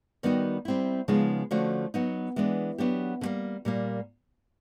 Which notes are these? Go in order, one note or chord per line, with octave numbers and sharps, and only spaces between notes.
D#3 G3 B3 D#4 F#4
G3 C4 E4
C#3 F3 G#3 B3 D#4
D3 F3 A3 C#4 F#4
F#3 B3 D#4
E3 G#3 B3 D4
F#3 B3 D4 G4
D3
G3 A#3
A#2 G3 A#3